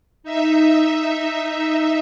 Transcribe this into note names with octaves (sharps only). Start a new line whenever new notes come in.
D#4 E5